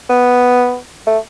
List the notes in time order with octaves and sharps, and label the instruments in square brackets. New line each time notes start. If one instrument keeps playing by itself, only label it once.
[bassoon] B3
A3